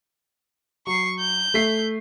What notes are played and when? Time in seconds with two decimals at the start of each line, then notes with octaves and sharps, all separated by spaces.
0.87 F#3 C#6 C7
1.19 G6
1.54 A3 B6 C7